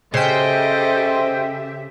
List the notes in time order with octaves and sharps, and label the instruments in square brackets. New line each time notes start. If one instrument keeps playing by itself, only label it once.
[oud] C#3 [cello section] G4 E5 [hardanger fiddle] A4 D#5 [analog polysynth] C5 G5